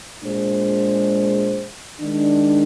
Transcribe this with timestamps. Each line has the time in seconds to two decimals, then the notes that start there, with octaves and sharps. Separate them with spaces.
0.24 A#2 G#3 D4 G#4 C5
2.01 D#3 G#3 D4